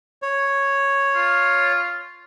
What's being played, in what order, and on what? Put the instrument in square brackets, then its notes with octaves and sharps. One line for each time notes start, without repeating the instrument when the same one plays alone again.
[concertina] C#5
[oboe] F4